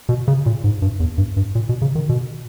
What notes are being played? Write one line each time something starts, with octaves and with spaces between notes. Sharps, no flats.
B2
C#3
A#2
G#2
G2
E2
G2
G2
A#2
B2
C#3
D#3
B2